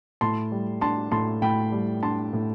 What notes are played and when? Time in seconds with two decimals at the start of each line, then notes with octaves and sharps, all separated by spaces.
0.21 A2 A5 C6
0.52 G3
0.81 D4 A5 C6
1.12 A2 A5 C6
1.42 A2 G5 B5
1.72 G3
2.03 D4 A5 C6
2.33 A2